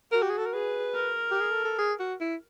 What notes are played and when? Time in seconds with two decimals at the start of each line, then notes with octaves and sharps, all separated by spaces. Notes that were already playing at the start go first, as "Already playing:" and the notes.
0.11 F#4 A#4
0.23 G4
0.30 G#4
0.38 A4
0.46 A#4
0.53 G#4 B4
0.94 A#4
1.31 G4
1.41 G#4
1.51 A4
1.65 A4
1.79 G#4
2.00 F#4
2.21 E4